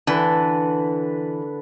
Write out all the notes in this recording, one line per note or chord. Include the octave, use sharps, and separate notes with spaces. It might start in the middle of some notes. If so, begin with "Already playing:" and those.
D3 E3 B4